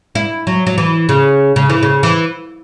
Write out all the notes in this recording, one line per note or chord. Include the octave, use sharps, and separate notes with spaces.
E4
F#3
F#3
E3
C#3
C#3
E3
C#3
E3